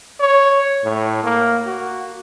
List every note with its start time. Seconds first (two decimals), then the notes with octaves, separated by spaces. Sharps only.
0.20 C#5
0.84 A2
1.24 A#3
1.66 F#4